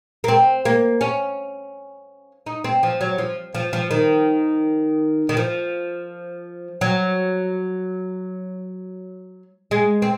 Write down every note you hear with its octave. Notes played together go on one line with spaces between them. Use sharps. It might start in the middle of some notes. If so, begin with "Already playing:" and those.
A#3
C4
A#3
C#4
D#4
C4
F3
F#3
F3
F3
F3
D#3
D#3
F3
F#3
G#3
C4